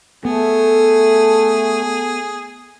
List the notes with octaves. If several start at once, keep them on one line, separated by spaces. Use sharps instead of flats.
A3 B3 G#4 A4